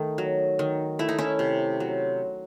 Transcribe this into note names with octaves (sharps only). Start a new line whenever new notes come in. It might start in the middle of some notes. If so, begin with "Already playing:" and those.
Already playing: D#3 A3 D#4
F#3
D#3
A3 E4
D#4
C#4 E4
C3
F#3